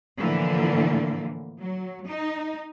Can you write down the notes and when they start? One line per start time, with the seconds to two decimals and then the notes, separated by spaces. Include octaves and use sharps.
0.19 A2 D3 E3 F3 A#3
1.60 F#3
2.08 D#4